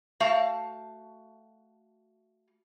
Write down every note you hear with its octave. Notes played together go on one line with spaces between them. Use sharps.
A3 F#4 F5 A5